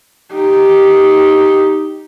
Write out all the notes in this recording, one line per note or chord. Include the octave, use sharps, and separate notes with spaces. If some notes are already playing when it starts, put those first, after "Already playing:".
D#4 G4